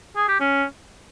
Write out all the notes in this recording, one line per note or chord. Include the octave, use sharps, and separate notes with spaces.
G#4
G4
C#4